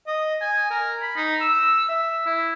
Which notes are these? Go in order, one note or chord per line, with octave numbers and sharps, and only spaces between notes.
D#5
G#5
A#4
B5
D#4
E6
E5
E4